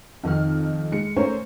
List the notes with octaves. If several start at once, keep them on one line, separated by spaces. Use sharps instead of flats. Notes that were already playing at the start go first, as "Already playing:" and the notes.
F2 D#3 D#4 F6
G#3 C#7
A3 C#4 A#4 C5 C#5